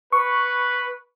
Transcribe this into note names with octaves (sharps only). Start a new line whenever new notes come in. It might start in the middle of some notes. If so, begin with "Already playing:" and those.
B4 C#6